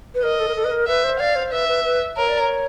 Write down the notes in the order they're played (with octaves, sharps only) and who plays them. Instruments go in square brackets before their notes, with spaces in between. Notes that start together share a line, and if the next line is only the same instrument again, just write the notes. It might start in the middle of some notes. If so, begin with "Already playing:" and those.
[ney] B4
[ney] A#4 [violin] D#5
[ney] A4
A#4
A4
B4
A#4
[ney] B4 [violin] E5
[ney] C5
[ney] D5 [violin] F5
[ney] C5
[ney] B4 [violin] E5
[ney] B4
B4
[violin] A#4 [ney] C#5
[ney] D5
C#5